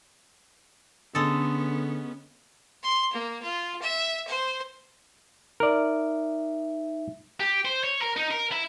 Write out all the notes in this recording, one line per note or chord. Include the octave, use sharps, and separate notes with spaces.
D3 G#3 B3 C#4 A4
C6
A#3
F4
E5
C5
D#4 A#4 D5 E5
G4
C5
C#5
A#4
D#4
A#4
E4